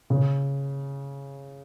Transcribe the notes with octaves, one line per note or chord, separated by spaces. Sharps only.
C#3